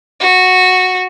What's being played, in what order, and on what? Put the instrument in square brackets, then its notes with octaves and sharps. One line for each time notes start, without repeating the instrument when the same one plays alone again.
[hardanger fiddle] F#4